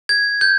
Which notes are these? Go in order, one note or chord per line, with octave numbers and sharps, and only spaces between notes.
G#6
G6